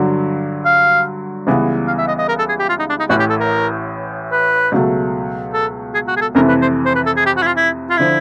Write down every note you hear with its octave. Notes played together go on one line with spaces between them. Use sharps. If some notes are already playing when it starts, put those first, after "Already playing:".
Already playing: G2 D3 F#3
F5
C#2 C#3 E3 G3 B3
F5
E5
D#5
D#5
A#4
A4
G#4
G4
F4
D#4
D4
D#4
A1 A2 E3 F#4
G4
A4
A#4
B4
C#2 B2 F#3 A3
A4
G#4
F#4
G#4
A4
F2 C3 E3 A3 A#4
B4
C5
C5
B4
A4
G#4
G4
F#4
E4
F4
E4
F4
D3 F3 E4